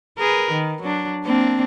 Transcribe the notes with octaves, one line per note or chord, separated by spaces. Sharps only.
G#4 A#4 B4
D#3
F#3 D4
A#3 C4 D4